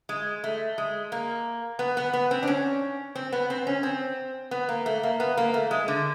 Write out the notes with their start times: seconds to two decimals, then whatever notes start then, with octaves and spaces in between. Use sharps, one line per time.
0.09 G#3
0.44 A3
0.78 G#3
1.12 A#3
1.79 B3
1.97 B3
2.13 B3
2.31 C4
2.43 D4
2.47 C#4
3.15 C4
3.32 B3
3.50 C4
3.67 C#4
3.83 C4
4.51 B3
4.69 A#3
4.86 A3
5.03 A#3
5.20 B3
5.37 A#3
5.54 A3
5.71 G#3
5.88 D3